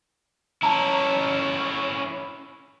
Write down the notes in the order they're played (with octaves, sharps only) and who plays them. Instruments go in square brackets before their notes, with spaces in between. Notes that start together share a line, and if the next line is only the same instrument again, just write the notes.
[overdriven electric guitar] C#4 E4 [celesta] A5 A#5